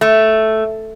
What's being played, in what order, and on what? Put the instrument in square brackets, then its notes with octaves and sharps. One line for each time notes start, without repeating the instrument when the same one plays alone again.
[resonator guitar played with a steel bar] A3